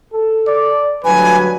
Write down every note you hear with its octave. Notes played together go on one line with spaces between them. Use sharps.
A4
D5
D2 G2 F#3 B4 G#5